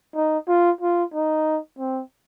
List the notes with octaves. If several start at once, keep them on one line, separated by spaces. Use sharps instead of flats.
D#4
F4
F4
D#4
C4